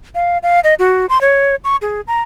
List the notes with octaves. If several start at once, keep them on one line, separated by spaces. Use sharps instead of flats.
F5
F5
D#5
F#4
C6
C#5
C#6
G#4
A#5